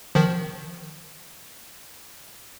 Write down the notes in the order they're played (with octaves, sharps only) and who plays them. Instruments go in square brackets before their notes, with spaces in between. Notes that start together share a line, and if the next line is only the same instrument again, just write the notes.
[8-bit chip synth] D#3 F3